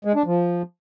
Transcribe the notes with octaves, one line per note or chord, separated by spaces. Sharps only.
G#3
D4
F3